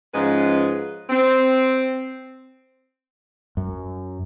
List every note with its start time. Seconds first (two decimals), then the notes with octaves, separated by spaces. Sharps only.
0.13 G#2 F3 G#3 C#4 B4
1.10 C4
3.57 F#2